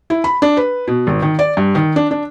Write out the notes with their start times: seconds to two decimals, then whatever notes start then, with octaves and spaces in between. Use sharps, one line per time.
0.10 E4
0.24 B5
0.42 D4
0.57 B4
0.88 B2
1.07 G#1
1.22 D#3
1.39 D5
1.57 G2
1.75 D#3
1.96 D4
2.11 D4